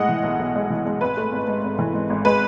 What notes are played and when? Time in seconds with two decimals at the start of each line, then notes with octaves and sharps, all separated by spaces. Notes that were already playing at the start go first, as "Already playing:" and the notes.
Already playing: A2 G#3 D#5 F#5
0.09 E3
0.24 B1
0.39 B1
0.55 G#3
0.70 E3
0.86 G#3
1.01 G#1 B4
1.17 A3
1.32 G#1
1.48 G#2
1.63 G#1
1.79 E3
1.94 G#2
2.10 G#1
2.25 G#3 B4